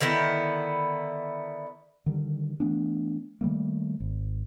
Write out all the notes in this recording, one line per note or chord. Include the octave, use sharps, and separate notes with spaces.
D3 D#3 B3 E4
D3 D#3 G3
E3 A3 B3 D4
D#3 G3 A3 A#3
G#1